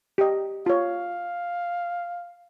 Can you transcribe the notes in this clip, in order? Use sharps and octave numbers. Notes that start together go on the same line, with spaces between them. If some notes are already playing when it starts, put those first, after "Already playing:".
G4 D#5
F4 C#5 F5